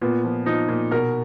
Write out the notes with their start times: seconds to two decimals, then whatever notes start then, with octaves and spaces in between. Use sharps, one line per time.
0.01 A#2 B3
0.24 F3
0.46 F3 D#4
0.69 A#2
0.91 B2 A#4